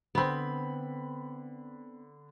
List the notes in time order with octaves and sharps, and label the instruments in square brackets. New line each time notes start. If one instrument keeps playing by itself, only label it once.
[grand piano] D3 B5 [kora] B3 C4